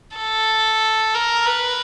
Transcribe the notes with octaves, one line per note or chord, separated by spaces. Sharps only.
A4
A#4
B4